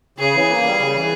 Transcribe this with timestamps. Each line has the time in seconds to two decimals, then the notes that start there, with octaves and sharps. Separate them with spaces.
0.18 C#3 G#4
0.34 E3
0.49 A#3
0.65 G3
0.78 C#3
0.95 E3